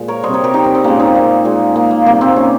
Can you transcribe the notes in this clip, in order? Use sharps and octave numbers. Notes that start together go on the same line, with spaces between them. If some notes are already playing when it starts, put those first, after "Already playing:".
Already playing: A#2 F3 G#3
A#4 C#5
C3 G3 C5 D#5
A#4 C#5
G4 A#4
D#4 G4
C4
C4
A#2 G#3 A#3 C#4
C4 D#4
A#3
A#2 G#3
A#3
A#3
C3 G3 A#3
C4
A#3 C#4